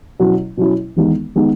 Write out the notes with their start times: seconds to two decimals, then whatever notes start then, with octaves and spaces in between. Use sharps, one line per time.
0.20 B2 F#3 C#4 E4
0.57 B2 F#3 C#4 E4
0.96 E2 D#3 G#3 B3 D#4
1.36 D#3 G#3 B3 D#4